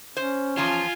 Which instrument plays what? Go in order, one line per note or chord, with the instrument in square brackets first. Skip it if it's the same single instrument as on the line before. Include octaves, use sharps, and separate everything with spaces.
[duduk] C#4 [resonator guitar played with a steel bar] C5
[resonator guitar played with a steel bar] E2 F3 A5 [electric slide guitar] F4 [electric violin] G#5